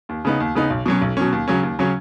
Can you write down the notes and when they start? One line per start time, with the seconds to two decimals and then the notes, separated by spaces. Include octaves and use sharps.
0.09 D#2
0.25 C#3 B3 D#4
0.40 D#2
0.55 C#3 B3 D#4
0.70 B1
0.86 B2 F#3 C#4
1.02 B1
1.17 B2 F#3 C#4
1.32 D#2
1.48 C#3 F#3 C#4
1.63 D#2
1.79 C#3 F#3 C#4